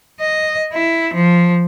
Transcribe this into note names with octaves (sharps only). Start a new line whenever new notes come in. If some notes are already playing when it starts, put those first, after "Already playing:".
D#5
E4
F3